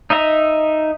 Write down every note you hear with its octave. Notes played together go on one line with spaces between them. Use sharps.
D#4 D#5 E5 A#5